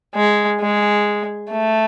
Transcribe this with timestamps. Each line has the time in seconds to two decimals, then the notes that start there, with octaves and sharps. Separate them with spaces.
0.15 G#3
0.61 G#3
1.51 A3